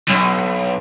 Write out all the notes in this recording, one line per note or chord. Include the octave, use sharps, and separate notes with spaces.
B1